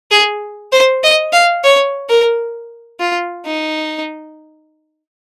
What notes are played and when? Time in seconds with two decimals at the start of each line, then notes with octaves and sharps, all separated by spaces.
0.11 G#4
0.72 C5
1.03 D#5
1.33 F5
1.64 C#5
2.09 A#4
3.00 F4
3.46 D#4